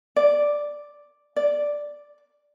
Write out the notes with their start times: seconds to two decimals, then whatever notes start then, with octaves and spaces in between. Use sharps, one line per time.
0.16 D5
1.36 D5